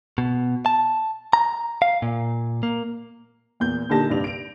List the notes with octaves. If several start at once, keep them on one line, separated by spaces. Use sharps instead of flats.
B2
A5
A#5
F5
A#2
A#3
E2 A#2 G6
A#2 D3 D#4 G4 A5 A#6
G2 C3 D5 F7
D7 F7